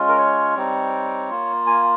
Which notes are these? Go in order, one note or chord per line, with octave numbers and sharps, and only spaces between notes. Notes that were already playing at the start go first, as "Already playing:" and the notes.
Already playing: G#3 C#4 F4
A#4
C#5
G3 C4 D#4
A#3 F4
G#5